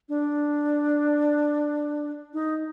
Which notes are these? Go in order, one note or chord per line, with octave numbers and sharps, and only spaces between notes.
D4
D#4